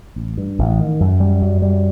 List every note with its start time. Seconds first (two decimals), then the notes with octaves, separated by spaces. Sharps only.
0.16 A1
0.37 G2
0.59 A1
0.79 D#3
1.00 F#2
1.20 G3
1.42 F#2
1.62 G3